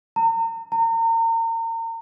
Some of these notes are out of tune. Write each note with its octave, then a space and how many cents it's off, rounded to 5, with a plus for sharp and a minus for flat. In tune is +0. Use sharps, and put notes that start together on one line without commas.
A#5 -40
A#5 -35